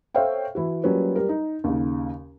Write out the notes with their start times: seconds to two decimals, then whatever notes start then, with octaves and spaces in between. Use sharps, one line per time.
0.14 A4 C5 C#5 E5 F5 G5
0.55 E3 E4 F#4
0.84 F#3 G3 A#3 C#4 F4 B4
1.16 G3 A#4
1.29 D#4
1.64 D#2 C#3